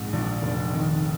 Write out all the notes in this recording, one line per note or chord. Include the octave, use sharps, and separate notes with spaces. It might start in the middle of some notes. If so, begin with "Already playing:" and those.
Already playing: A#1 G#2
A#1
F1
D#3